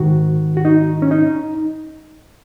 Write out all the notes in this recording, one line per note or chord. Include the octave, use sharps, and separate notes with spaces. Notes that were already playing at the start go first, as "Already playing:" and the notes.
Already playing: G#2 D#3 F#4
F#4
D#4
C#4
D#4